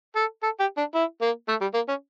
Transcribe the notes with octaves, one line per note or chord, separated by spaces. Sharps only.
A4
A4
G4
D4
E4
A#3
A3
G3
A#3
C#4